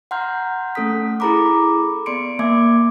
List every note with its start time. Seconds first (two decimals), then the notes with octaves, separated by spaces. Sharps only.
0.11 F#5 A#5 C6 F6 G6
0.75 A3 C#4 A4 F#5 D#6 B6
1.20 E4 G#4 A4 A#5 B5 D6
2.06 B3 D5 C6 C#7 D7
2.39 A#3 E5 G#5 D6 G#6 D7